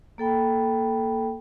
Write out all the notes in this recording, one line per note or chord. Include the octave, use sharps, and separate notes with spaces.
A#3 A4 G5 B5